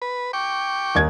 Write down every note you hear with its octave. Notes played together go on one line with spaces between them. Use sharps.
B4
G5 C#6 D6
D#2 D#4 G#6